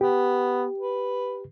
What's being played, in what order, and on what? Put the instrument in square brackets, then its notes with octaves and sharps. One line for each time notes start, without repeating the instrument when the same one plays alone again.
[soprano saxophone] B3 [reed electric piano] G4
[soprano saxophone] B4